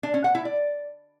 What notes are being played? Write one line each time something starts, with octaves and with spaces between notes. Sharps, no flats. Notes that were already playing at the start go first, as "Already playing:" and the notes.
D4
C#4
F#5
E4
D5